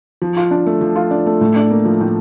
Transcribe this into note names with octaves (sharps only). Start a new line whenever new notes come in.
F3
F4
D4
A3
F3
F4
D4
A3
A2
D4
A#3
F3
A2